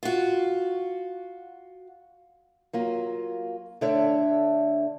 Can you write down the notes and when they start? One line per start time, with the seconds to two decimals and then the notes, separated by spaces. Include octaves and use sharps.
0.03 F4 F#4
2.73 F#3 A#3 F4
3.81 D3 A3 D4 C#5 D5 E5